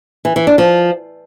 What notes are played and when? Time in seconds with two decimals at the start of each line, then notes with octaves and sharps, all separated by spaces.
0.25 E3
0.36 E3
0.47 D4
0.58 F3